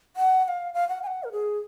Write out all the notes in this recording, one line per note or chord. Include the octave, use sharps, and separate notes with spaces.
F#5
F#5
F5
F5
F#5
G#5
F#5
A#4
G#4